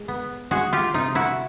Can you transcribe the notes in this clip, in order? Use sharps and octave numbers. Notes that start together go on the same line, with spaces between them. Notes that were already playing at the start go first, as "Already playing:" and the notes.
Already playing: G#3
B3
G#3 F#4 G#4
F4 G4
C3 D#4 F4
E4 F#4